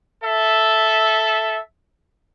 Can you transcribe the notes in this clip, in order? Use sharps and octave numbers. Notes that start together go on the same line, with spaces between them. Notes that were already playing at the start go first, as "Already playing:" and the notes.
A4 E5